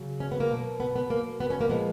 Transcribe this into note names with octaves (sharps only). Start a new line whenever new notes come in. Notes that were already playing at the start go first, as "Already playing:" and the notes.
Already playing: C#3 F#3
C#4
B3
A#3
B2 F#3
B3
B3
A#3
B3
C#4
A#3
A#2 F3 G#3 B3